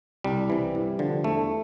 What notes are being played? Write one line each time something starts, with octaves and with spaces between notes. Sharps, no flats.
C2 G3
C3 E3
G2
D3 F3
E2 A3